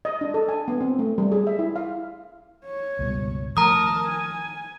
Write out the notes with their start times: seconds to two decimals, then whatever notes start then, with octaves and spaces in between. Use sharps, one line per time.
0.05 D#5
0.21 D4
0.34 A4
0.49 G#5
0.68 B3
0.81 C4
0.99 A3
1.18 G3
1.32 G#4
1.47 E5
1.59 E4
1.76 F5
2.66 C#5
2.99 C#2 G2 B2
3.57 D#3 F3 A3 A#4 A5 A#5 D#6
4.08 G#5